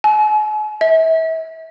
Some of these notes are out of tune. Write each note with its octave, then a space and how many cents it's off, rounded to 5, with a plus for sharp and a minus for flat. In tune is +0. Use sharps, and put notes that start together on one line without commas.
G#5 +45
E5 -35